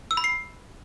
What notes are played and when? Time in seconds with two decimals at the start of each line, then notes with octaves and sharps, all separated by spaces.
0.11 E6
0.17 B5
0.24 C7